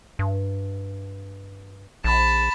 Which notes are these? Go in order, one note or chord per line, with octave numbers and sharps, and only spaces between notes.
G2
A#1 A5 B5